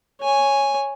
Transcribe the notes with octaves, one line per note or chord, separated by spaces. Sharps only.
C#5 G#5